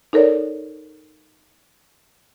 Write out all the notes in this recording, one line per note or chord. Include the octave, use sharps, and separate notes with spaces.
D#4 A4 A#4 C#5 D5